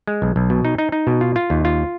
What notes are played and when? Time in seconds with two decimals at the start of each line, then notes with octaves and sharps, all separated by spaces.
0.07 G#3
0.22 B1
0.36 B1
0.50 B2
0.65 D#4
0.78 D#4
0.92 D#4
1.07 B2
1.21 F4
1.36 F4
1.50 D#2
1.65 F4